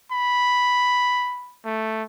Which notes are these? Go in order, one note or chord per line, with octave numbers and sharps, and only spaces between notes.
B5
A3